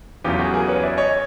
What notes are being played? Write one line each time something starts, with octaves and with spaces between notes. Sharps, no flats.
E2 C#3 F#3 A3 F4 G4
F#4 G#4
G#4 A#4
B4 C#5
D5 E5
C#5 D#5